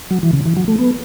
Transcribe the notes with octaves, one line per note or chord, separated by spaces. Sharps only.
F#3
E3
C#3
E3
F#3
A3
B3